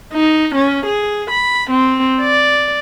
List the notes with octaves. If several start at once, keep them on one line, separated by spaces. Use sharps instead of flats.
D#4
C#4
G#4
B5
C4
D5